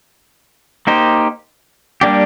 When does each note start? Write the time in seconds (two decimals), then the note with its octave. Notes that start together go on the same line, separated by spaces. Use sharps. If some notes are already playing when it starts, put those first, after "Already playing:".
0.87 A#3 D#4 G4 C5
2.01 G3 A#3 D4 G4